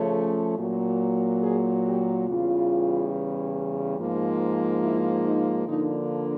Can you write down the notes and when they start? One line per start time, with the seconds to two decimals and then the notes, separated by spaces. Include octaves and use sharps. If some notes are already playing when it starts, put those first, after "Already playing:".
Already playing: C#3 F3 A3 C#4
0.58 A#2 F#3 A#3
1.42 G#4
1.85 G4
2.28 E2 C#3 E3 G3 F4
3.98 G#2 F3 A#3
4.83 E4
5.26 D#4
5.67 D3 F3 A#3 D4 D#4